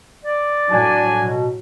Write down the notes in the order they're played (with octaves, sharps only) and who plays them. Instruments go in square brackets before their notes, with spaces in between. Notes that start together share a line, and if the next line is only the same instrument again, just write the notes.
[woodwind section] D5
[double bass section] A2 F#3 [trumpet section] D4 G#5
[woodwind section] B2